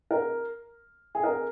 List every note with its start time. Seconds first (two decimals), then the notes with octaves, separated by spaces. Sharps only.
0.11 A#4
1.15 G#4
1.24 A#4